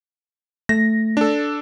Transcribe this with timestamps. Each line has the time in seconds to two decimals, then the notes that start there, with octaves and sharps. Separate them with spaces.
0.69 A3 A#6
1.17 D4 A4